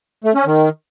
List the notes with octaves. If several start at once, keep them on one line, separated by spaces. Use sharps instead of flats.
A3
C#4
D#3